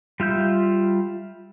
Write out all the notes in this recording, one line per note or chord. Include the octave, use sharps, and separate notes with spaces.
G3 F4 E5 G6